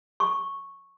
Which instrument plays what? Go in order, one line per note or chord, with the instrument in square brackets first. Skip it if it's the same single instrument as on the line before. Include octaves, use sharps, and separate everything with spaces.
[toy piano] C#6